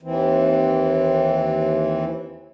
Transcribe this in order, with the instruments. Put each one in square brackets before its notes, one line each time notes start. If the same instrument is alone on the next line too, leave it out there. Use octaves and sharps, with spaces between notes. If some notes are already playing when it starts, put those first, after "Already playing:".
[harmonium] D#2 E3 C4